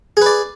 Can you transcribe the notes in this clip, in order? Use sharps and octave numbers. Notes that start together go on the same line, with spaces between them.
G#4 B4 D5